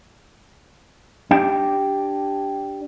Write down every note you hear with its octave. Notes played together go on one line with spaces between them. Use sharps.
D4 G4 G5